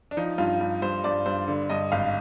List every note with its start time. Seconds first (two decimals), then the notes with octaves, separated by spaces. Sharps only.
0.11 D4
0.17 F3 D#4
0.38 G2 F4
0.61 G2
0.82 G2 C5
1.04 G2 D5
1.26 G2 C5
1.48 D3
1.70 G2 D#5
1.92 G#1 F5